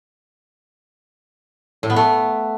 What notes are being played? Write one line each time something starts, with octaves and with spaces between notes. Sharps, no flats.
A2
B3
A3